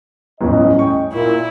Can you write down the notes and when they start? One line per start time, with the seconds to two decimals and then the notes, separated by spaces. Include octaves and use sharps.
0.41 D1 G1 E2 C#4 D#5
0.79 G5 C#6
1.13 A#2 E4